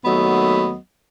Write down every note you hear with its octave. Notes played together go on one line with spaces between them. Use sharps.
D#2 F#3 A3 B3 D#5